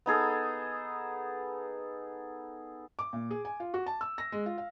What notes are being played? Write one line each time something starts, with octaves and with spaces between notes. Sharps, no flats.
B3 D#4 G#4 A4
D6
A#2
G#4
G#5
F4
F#4
A5
E6
A#6
G#3
F4
F5